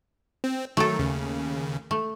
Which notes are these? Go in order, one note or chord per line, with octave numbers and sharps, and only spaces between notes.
C4
D#3 F#3 A3 A4
D#2 C#3
A3